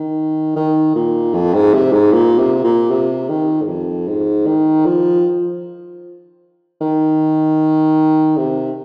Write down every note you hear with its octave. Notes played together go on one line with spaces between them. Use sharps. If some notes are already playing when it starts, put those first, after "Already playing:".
Already playing: D#3
D#3
A#2
F2
G#2
C3
G#2
A#2
C3
A#2
C3
D#3
G#2
F2
G#2
D#3
F3
D#3
C3